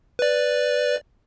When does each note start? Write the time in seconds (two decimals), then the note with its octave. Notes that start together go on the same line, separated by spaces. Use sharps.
0.19 B4 D5